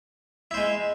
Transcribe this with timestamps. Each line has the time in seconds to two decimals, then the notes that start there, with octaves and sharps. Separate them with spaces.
0.51 E4
0.54 C5
0.57 G#3